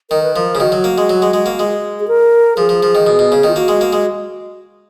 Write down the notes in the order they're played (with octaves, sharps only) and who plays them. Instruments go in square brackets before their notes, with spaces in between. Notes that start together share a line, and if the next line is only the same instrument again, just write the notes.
[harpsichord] D#3 [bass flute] A#4
[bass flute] B4
[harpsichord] F3 [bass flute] A#4
[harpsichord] C#3
[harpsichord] D#3 [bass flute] F#4
[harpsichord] F#3
A#3
G#3
F#3
G#3
G#3
A#3
G#3
[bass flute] G#4
A#4
[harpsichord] F3 [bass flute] G#4
[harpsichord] F3
F3
D#3
B2
B2
C#3
[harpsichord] D#3 [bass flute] F4
[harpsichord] A#3 [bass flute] F#4
[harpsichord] G#3
A#3
G#3